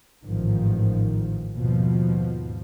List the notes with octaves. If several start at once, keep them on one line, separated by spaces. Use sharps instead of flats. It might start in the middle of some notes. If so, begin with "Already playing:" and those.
A1 G#2 D#3 F3
D#2 G#2 B2 F3